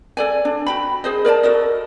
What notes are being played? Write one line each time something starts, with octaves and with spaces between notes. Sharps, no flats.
A4 D5 G#5
D4
F#4 G5 B5
G#4 C5 D#5
A#4 D5 G5 A5
F#4 A4 A#4 D#5